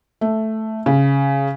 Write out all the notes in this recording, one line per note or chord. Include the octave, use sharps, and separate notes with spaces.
A3
C#3